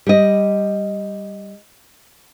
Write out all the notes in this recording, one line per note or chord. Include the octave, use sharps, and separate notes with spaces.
G3 D#5